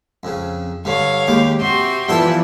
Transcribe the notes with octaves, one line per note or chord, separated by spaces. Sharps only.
F2 C#3
G2 D3 C#5 F5
D#2 G#3 G4 D6
C3 F#4 C6
E3 F3 G3 B3 E4 A4 A5